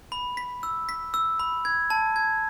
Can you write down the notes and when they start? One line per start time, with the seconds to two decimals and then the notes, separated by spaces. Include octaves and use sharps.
0.12 B5
0.37 B6
0.63 E6
0.89 B6
1.14 E6
1.39 B5
1.65 G#6
1.90 A5
2.16 G#6